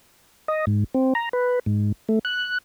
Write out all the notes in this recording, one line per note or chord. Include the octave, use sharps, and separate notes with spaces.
D#5
G#2
C4
A#5
B4
G#2
A3
F#6